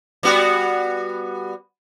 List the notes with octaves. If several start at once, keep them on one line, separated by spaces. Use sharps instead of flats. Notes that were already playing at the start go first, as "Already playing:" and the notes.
G3 B3 F#4